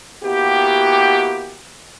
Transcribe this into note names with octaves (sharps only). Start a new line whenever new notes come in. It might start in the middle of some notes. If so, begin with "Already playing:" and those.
A#3 B3 E4 F#4 G4